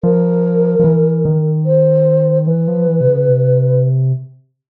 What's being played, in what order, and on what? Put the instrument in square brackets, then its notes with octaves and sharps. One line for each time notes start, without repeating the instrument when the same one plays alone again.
[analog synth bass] F3 [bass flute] A#4
[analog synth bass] F3
E3
D#3
[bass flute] C5
[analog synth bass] E3 [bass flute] B4
[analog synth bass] F3
E3
C3
C#3
C3